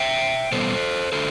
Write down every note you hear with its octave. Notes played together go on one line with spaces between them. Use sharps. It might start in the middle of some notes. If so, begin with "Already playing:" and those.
Already playing: E5 G5
B2 G3 B3 A4 C5
D3 A4 C5